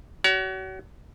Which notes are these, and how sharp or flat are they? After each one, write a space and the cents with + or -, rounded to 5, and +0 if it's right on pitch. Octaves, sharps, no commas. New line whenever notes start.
F#4 +35 C#5 +40